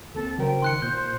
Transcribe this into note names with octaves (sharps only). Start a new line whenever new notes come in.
D2 A#3 C4 A4
C#3 F#3 A#4 C5 G5
D#3 C6 F#6 C#7
A#2 C5 G6